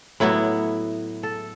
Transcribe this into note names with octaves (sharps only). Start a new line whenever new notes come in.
A2 F#3 B3 E4
A4